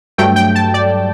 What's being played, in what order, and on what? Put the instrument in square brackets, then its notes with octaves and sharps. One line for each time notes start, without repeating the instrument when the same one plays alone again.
[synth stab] G2 F#3 A3 G5
G5
A5
D5